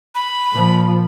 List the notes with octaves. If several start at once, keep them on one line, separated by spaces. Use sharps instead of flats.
B5
A#2 F3